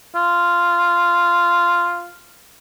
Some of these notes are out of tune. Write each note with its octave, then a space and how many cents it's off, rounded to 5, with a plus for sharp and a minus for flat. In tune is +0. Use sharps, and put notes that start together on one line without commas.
F4 -10